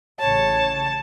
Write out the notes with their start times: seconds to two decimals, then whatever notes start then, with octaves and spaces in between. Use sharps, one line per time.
0.20 A1 C#3 C#5 A5